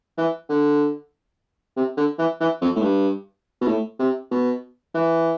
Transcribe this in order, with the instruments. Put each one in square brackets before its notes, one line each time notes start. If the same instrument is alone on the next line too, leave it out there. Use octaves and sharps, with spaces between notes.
[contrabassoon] E3
D3
C3
D3
E3
E3
F2
A2
G2
B2
A2
C3
B2
E3